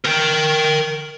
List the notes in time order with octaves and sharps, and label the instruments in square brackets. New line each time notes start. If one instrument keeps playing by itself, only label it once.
[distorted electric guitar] A#4 G5